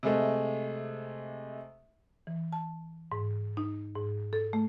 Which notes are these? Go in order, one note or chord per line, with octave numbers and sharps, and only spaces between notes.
C3 G#3 A3
E3
A5
G#2
D#4
G#2
A4
A3